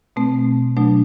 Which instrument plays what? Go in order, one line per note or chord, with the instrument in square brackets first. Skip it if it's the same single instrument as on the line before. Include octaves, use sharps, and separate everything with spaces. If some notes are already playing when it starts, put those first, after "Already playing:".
[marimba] B2 A3 C4
B2 F#3 A3 D4